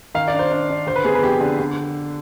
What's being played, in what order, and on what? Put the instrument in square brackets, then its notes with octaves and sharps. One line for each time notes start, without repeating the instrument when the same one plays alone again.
[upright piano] D#3 F5
D5
D4
C5
D4
D4
D3 C5
B4
B3 G#4
B4
F2 G4
D3
D3